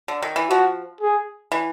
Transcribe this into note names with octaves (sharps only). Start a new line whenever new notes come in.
D3
D#3
E3
F3 F#4
G#4
E3